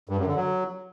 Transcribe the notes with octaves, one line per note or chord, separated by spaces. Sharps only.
G2
F#2
D3
F#3